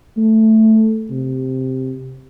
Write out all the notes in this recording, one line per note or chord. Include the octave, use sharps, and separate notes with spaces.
A3
C3